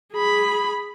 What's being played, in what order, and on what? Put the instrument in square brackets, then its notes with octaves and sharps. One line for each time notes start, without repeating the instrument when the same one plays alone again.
[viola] G#4 B5